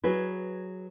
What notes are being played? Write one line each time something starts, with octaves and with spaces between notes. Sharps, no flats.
F#3 G#4 B4